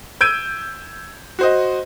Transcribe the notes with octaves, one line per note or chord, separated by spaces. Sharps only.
E6 G6 G#6 D7 D#7
F#4 C5 D#5